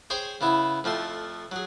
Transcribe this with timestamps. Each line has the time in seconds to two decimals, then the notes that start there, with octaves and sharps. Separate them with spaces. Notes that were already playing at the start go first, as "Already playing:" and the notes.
0.10 G#4 C5 C#5 G5 G#5
0.41 C#3 B3 E4
0.84 F2 F3 A3 C6
1.52 F#3 G#4